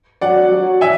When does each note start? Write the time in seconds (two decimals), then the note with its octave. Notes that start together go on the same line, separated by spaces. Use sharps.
0.21 F#3 D5 F#5
0.52 F#3
0.81 E5 G#5